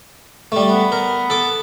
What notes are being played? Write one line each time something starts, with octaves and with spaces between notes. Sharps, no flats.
G3 A3
B3
A#4
A4 D6